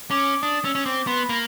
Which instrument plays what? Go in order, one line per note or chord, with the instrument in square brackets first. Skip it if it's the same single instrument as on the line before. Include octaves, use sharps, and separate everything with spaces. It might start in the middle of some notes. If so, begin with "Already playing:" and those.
[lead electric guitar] C#4 [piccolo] D6
[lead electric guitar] D4 [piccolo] D#6
[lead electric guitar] C#4 [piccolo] E6
[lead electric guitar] C#4
[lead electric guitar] C4 [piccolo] D6
[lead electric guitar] B3 [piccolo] C6
[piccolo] B5
[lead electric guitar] A#3